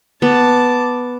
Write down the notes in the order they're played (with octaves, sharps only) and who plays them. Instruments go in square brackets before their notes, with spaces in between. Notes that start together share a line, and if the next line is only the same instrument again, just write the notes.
[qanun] B3 [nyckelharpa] A5 D6